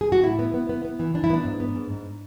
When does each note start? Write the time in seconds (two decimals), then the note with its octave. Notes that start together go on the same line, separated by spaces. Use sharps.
0.01 G#4
0.12 F#4
0.24 A2 E4
0.39 B3
0.54 B3
0.69 B3
0.85 B3
0.99 E3
1.14 E3 D4
1.24 E4
1.30 B3 D4
1.45 G#2
1.60 B3
1.75 G#2
1.90 G#2